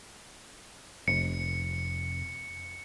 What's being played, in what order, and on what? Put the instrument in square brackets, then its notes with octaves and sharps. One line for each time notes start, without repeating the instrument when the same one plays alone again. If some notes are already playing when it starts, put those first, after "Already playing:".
[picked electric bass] F1 [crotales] C#7